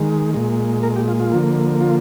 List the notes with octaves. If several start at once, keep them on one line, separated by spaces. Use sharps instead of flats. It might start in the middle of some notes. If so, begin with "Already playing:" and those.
Already playing: D#3 G#3
A#2 G#3
A#4
G4
F4
F4
D3 F3 A#3
F4